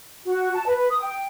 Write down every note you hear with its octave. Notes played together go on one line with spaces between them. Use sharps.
F#4
A5
B4
D#6
G5